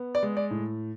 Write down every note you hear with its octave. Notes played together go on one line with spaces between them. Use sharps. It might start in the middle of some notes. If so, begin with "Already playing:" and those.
Already playing: B3
D5
G#3
D5
A2